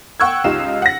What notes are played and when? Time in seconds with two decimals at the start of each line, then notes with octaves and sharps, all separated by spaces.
0.20 F#5 G5 C#6 E6 F#6 G#6
0.44 C#2 D#4 F4 G4 F5 E7
0.82 F#5 A#6